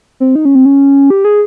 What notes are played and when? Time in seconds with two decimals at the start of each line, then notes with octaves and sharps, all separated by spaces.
0.20 C4
0.35 D#4
0.45 C#4
0.55 C4
0.65 C#4
1.10 G4
1.25 G#4